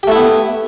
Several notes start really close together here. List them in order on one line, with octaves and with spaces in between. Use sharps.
G4 A3 E4 B3